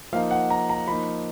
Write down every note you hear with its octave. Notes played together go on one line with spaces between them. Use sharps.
F3 A#3 D#4 F5
F#5
A#5
A#5
F3 A#3 D#4 B5